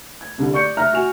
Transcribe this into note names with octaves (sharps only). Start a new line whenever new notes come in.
G#6
C2 D3
D5 C#6 G6 C#7
E5 A#5 F6 F#6
F#4 G#5 F7